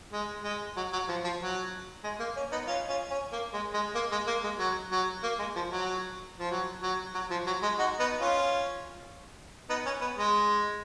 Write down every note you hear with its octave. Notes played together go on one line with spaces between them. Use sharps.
G#3
G#3
F#3
F#3
F3
F3
F#3
G#3
A#3
C#4
B3 D#4
C#4 F4
C#4 F4
C#4
A#3
G#3
G#3
A#3
G#3
A#3
G#3
F#3
F#3
A#3
G#3
F3
F#3
F3
F#3
F#3
F#3
F3
F#3
G#3
D#4 F#4
B3 D#4
C#4 F4
B3 D#4
C#4
B3
G#3